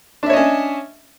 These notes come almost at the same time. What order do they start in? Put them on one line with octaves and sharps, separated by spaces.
D4 E5 C#5 D#5 C#4